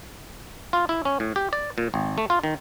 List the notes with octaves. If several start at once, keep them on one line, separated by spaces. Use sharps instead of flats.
F4
E4
C#4
A2
G4
D5
A#2
G#1
A3
F4
D#3